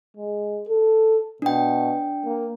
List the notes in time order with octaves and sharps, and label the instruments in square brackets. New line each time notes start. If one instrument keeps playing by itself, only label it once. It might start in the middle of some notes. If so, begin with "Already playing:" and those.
[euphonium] G#3
A4
[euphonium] B2 [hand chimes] D4 G5
[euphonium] A#3